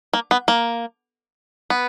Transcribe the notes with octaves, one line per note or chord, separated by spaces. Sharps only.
A#3
B3
A#3
B3